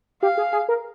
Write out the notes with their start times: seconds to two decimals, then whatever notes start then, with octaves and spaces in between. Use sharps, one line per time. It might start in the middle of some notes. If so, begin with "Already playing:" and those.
0.23 G4 F5
0.38 G#4
0.53 G#4
0.69 A#4